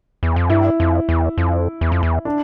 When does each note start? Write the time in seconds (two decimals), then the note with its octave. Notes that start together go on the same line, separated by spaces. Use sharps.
0.23 E2
0.36 F2
0.50 G2 E4
0.80 F2
1.09 E2
1.38 F2
1.81 E2
1.92 F2
2.03 E2
2.25 D4